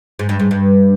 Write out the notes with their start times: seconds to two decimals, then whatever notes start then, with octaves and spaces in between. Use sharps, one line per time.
0.19 G#2
0.29 G2
0.40 G#2
0.51 G2